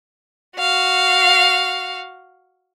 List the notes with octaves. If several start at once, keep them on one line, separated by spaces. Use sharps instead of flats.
F#4 F5